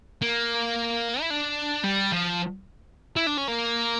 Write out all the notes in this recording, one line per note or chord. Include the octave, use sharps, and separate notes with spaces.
A#3
E4
D4
G3
F3
E4
D4
C#4
A#3